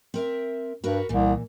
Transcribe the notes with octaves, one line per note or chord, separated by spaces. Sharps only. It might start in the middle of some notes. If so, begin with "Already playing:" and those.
C4 A#4 E5
G2 F#4 A#4 B4
C2 A#2 E3